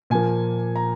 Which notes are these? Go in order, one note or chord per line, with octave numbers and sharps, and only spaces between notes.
A#2 F3 A#3 G#5
A#5